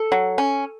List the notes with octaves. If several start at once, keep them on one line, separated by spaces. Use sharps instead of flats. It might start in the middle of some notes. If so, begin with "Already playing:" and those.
Already playing: A4
F#3
C#4